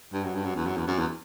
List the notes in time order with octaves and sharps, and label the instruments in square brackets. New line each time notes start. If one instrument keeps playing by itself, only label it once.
[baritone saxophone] G2
F#2
G2
F#2
E2
F#2
E2
F#2
E2